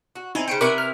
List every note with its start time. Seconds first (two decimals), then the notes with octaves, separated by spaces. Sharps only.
0.16 F#4
0.35 C4 D#4 E4 G#5
0.48 C#3 C5 G5 C#7 D7
0.61 C3 E4 A#4 B4 C#6 D6
0.78 F6